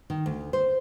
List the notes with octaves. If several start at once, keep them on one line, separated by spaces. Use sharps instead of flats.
D#3
D2
C5